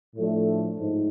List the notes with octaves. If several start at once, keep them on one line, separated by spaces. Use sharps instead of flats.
A2 F3 A3 D4
G#2